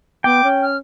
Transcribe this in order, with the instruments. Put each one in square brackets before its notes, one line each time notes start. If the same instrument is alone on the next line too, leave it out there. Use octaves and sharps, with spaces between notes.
[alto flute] B3 [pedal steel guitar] G5 [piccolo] D6
[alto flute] C#4
[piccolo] F6